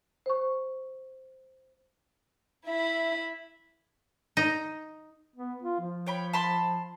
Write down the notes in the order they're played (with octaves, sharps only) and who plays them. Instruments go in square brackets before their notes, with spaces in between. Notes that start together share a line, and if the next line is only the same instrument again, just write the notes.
[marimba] C5 C#6
[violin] E4 B5 [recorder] E5
[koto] D#4
[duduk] B3
F4
F3
[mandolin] C#5 G5 B5
A5 B5 C6